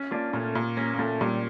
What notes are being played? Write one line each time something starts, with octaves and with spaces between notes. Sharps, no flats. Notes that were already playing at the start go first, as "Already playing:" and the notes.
Already playing: C#4
A#3 D4 F4
A#2 A3 C#4
A#2
A#3 C#4
A#3
A#2 A3
A#2 G3